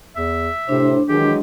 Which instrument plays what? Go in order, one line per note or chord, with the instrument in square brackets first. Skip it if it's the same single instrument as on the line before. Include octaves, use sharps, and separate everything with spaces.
[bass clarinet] E2 [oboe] E5
[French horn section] A2 C5 [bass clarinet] C3 [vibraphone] D4
[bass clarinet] D#3 [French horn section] E3 F#3 G#3 [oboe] G4